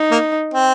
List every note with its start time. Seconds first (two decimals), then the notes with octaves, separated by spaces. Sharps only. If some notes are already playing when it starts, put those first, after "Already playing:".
Already playing: D#4
0.11 A#3
0.54 C4